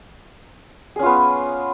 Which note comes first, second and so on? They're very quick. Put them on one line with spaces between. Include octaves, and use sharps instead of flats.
G#4 C#4 F4 B3